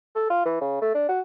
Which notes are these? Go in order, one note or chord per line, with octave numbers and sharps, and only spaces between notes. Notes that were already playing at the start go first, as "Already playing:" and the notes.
A4
F4
E3
C#3
A3
D4
F#4